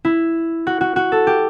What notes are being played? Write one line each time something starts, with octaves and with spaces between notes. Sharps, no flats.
E4
F#4
F#4
F#4
A4
G4